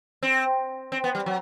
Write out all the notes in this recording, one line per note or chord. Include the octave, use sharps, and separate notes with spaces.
C4
C4
B3
G3
F#3